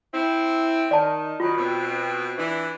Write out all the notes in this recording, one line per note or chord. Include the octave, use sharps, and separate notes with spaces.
C4 E4
D#3 D5 A5
D#3 F#3 F4
B2 C4
E3 D4